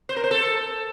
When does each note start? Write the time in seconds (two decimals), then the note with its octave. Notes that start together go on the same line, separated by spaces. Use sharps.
0.09 C5
0.16 A#4
0.24 C5
0.31 A4